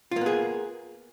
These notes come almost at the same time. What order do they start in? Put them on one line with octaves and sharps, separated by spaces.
F4 A#3 B3 G#4